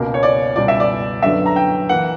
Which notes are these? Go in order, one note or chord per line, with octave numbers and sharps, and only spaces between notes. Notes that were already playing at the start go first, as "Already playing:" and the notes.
Already playing: C#2 B2 A#3
C#5
D5
C#2 B2 G3 D5
E5
D5
F#2 D3 F#3 B3 E5
A#5
G5
E3 A#3 F#5